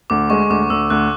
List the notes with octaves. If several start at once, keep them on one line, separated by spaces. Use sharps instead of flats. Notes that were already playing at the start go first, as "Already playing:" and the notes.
D2 D6
G#3 C#6
D2 D6
D2 E6
D2 F#6